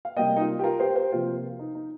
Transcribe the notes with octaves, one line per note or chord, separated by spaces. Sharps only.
F5
C3 G3 A#3 D#5 G5
D#4
F4
G4
F4 A#4
G4 C5
G4 C5
C3 F3 A#3 F4
D#4
D#4